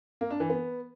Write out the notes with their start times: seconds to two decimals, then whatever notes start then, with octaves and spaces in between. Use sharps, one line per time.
0.21 A#3
0.31 D4
0.40 E3
0.50 B3